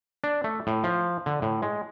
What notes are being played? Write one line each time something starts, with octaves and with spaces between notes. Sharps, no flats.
D4
A3
A2
F3
D3
A2
G#3